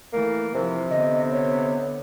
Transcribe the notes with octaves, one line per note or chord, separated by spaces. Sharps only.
E3 A3 A#3
C3 E3 F3
D3 B3 D#5
C#5